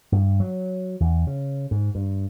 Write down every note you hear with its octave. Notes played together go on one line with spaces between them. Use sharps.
G2
F#3
E2
C#3
G#2
G2